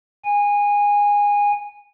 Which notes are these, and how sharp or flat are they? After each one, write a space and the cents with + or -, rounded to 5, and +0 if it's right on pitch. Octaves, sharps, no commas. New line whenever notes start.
G#5 -20